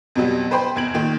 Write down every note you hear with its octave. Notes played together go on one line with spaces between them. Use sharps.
F2 B2 F#3 G3 B3
B4 C5 G5 B5 C6
F1 E2 G#6 D7 F#7
A#2 D#3